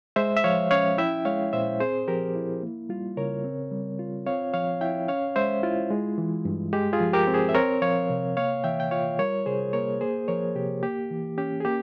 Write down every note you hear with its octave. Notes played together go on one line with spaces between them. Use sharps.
G#3 C5 E5
E5
F3 C#5 F5
C#4 C#5 F5
E4 E5 G5
G#3 C#5 F5
A#2 C5 E5
C4 G#4 C5
F3 G4 A#4
E4
A#3
G3 F4
C#3 A#4 C#5
C4
G3
F4
C4 C#5 F5
F3 C#5 F5
E4 E5 G5
C#4 C#5 F5
G#3 C5 E5
E4 F4
G#3
E3
G2
G#3 G4
F4 G#4
F3
G4 A#4
C4
G#4 C5
E5
C4 A#4 C#5
F3 C#5 F5
C3
A#3 C#5 F5
E3 E5 G5
G5
F4 C#5 F5
G3 A#4 C#5
C3 G#4 C5
A#3 A#4 C#5
A#3 G#4 C5
F3 A#4 C#5
C3 G4
A#3 G4
E3
C#4 G4
G#4
A#3 G4